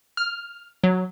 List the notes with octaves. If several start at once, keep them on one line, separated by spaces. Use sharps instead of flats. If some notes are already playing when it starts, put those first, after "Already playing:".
F6
F#3